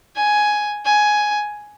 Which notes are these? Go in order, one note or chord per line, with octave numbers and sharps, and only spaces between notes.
G#5
G#5